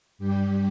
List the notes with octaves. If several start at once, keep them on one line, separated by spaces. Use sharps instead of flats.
G2 G3 G4